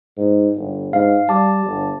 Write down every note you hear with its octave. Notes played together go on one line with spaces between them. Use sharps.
G#2
G1
G#2 F5
G3 A5 D6
G1